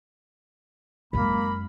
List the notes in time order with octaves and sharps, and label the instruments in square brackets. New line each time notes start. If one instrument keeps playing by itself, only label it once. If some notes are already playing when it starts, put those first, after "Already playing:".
[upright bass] F#2 G#3 [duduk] A#3 [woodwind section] B5